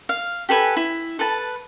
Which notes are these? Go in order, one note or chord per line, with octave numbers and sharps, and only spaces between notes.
F5
G4 A4 B4 G#5
E4
A4 B4 A5